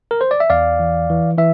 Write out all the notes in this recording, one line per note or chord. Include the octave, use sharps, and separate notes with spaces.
A#4
C5
D5
E5
E2 D5 F5
E3
E3
E3 E5